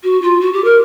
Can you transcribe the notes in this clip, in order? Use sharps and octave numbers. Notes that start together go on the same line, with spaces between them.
F#4
F4
F#4
G4
A#4